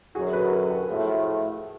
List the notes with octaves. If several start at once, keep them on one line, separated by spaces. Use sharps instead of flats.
F#2 D3 F#3 F#4 G#4
A4 B4
G#4 A#4
G4 A4
A4
A2 F3 A3 F#4 G#4